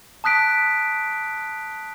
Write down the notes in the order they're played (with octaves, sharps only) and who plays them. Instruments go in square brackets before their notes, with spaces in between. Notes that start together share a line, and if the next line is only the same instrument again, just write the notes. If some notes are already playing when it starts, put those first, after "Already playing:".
[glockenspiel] A5 D#6 F#6 B6 D7